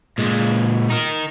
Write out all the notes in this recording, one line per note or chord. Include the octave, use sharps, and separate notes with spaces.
A#2 G#3
D#4 A#4